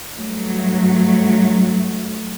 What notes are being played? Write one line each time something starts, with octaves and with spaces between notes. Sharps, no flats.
G2 F#3 A3